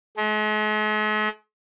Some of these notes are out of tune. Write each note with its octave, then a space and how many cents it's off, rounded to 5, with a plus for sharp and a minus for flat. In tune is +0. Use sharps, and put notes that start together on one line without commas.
G#3 +45